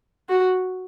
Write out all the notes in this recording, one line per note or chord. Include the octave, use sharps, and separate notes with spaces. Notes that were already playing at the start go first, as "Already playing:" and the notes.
F#4